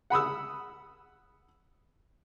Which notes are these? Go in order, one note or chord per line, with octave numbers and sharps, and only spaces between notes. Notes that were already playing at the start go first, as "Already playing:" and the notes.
F#5 B5 D#6 E6